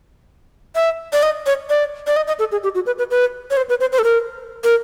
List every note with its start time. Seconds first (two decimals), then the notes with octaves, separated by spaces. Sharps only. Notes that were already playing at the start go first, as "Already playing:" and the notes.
0.75 E5
1.13 D5
1.23 D#5
1.46 C#5
1.70 D5
2.07 D5
2.16 D#5
2.27 D#5
2.39 A4
2.52 G#4
2.64 G4
2.75 F#4
2.86 B4
2.98 B4
3.11 B4
3.51 C#5
3.57 C5
3.69 B4
3.81 C5
3.92 C5
3.99 A4
4.04 A#4
4.64 A#4